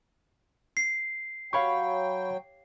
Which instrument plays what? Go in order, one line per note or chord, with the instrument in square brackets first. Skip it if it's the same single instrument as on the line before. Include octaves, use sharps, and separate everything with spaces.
[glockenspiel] C7
[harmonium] F#3 G5 [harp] G4 C#5 F5 [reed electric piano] B5 C#6